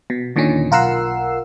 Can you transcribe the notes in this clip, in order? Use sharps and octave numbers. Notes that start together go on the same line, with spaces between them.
B2
D#2 A#2 D3 D#3 C#4
B1 F4 A#4 F#5 E6 C7